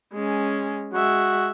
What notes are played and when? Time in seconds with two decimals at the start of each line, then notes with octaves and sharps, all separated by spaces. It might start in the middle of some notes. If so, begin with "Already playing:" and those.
0.13 G#3 C#4
0.93 G#3 F#4 E5